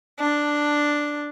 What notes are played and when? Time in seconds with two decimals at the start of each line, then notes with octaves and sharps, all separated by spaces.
0.19 D4